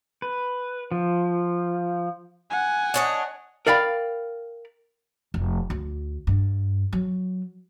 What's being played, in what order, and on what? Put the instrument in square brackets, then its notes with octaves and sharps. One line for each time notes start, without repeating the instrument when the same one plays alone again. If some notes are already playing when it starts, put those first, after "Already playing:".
[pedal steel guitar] B4
F3
[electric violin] F#5 G#5
[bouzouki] D4 C#5 D#5
[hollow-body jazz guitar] A#4 D5 F5 G5 B5
[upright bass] F1
D2
G2
F#3